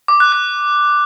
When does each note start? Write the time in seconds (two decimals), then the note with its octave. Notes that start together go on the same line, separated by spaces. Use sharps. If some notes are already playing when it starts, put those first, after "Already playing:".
0.08 D6
0.20 F#6
0.32 F#6